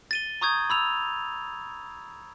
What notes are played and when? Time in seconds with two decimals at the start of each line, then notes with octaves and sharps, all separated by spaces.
0.11 A6 D#7 G7
0.41 A#5 C#6 D#6 G6 G#6
0.70 B5 E6 F7